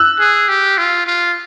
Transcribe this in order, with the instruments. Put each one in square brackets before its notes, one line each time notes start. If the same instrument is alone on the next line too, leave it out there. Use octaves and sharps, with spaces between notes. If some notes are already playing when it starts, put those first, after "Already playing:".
Already playing: [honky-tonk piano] E6 F#6
[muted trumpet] G#4
G4
F4
F4